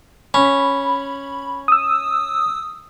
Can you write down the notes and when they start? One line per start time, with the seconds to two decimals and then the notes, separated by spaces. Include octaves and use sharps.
0.34 C#4 B5
1.68 D#6 E6